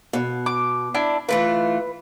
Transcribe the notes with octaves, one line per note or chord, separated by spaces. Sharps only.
B2
D6
D4 E4
E3 A3 F4 B4